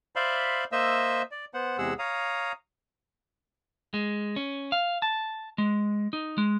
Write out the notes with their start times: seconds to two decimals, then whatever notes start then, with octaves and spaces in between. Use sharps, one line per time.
0.16 C5 D5 E5 F5 B5 C6
0.72 A#3 C5 D#5 E5 E6
1.31 D5
1.54 B3 C5 F#5
1.78 E2 C3 G#3 G#4 F#5 E6
1.99 C#5 F5 A#5 D#6
3.94 G#3
4.36 C#4
4.72 F5
5.02 A5
5.58 G#3
6.13 D#4
6.38 G#3